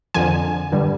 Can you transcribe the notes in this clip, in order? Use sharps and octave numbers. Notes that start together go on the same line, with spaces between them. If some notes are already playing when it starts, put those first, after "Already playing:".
F2 D3 F3 G#5
G2 D3 G3